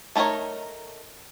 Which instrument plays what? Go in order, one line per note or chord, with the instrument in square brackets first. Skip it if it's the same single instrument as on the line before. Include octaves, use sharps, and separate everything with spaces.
[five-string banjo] A3 D#4 E4 A#4 C#5